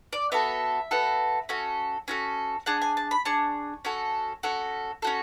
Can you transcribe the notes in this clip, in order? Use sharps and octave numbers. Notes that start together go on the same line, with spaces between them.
D5
B3 F#4 A4 E5
B3 F#4 A4
C#4 F#4 A4
C#4 F#4 A4
D4 G#4 F#5
G#5
A5
B5
D4 G#4 C#6
C#4 F#4 A4
C#4 F#4 A4
C#4 F#4 A4